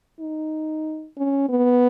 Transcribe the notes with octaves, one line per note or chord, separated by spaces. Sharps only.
D#4
C#4
B3